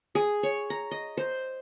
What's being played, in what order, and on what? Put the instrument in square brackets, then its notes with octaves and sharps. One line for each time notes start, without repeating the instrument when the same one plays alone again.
[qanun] G#4
C#5
A#5
D#5
C5